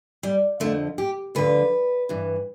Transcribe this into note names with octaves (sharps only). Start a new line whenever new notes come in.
G3
F2 D3 F3 A3
G4
D2 D3 F3 B4
G2 E3